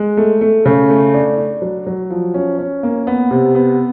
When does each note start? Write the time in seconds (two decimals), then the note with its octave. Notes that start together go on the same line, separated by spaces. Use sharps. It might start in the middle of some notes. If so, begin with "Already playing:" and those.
Already playing: G#3
0.17 A3
0.41 A3
0.65 C#3
0.90 A3
1.14 D4
1.37 D4
1.62 F#3
1.87 F#3
2.10 F3
2.34 C#4
2.59 C#4
2.83 A#3
3.07 B3
3.31 C3
3.55 B3